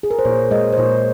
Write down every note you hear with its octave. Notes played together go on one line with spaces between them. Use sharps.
G#4
A#4
C5
A#2 C#5
G#3 D#5
C5
A#2 C#5